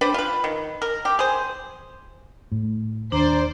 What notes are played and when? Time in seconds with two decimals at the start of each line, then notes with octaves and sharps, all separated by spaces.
0.01 D4 G4 B4 C5
0.14 F4 B4
0.44 D#3
0.82 A#4
1.05 G4
1.19 G#4 C5
2.52 A2
3.12 D#2 D4 C5 D5 A#5